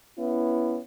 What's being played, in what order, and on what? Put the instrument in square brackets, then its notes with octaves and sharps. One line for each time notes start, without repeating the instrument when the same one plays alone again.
[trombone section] B3 C#4 E4